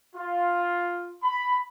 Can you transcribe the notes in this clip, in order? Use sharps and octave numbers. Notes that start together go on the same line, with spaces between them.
F4
B5